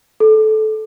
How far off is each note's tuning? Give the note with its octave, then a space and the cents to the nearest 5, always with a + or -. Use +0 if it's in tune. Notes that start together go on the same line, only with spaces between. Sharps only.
A4 -15